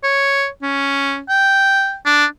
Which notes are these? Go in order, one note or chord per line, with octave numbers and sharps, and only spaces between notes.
C#5
C#4
G5
D4